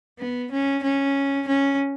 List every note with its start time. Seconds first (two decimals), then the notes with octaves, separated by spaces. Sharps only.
0.19 B3
0.51 C#4
0.83 C#4
1.47 C#4